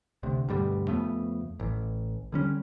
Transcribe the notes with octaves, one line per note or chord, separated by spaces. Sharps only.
D2 C3
D2 G2 B2 G3
F2 C#3 A3 B3
A1
D3 G3 C#4